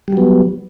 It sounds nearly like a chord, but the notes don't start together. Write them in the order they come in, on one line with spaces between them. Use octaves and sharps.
G3 F#3 B3